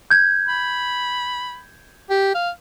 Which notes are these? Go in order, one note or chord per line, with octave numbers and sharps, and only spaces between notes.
G6 G#6
B5
G4
F5